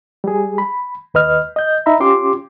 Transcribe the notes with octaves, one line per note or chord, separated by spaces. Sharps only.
G3 G#4
B5
D#2 B4 D#5 F6
D#5 G6
D#4 E5 A#5 B5
C#4 F4 G4 C6 D6